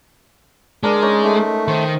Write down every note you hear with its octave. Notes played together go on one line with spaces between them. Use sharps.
G#3 D4 A#4 D5
C#4 D#4 D5
A3 D#4
D#3 C5